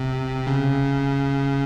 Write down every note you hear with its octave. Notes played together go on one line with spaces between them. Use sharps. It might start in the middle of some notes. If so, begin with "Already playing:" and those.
Already playing: C3
C#3